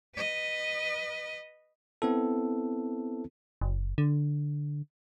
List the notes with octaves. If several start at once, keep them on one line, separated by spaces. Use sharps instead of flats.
B4 D#5
B3 C4 E4 A4
F#1
D3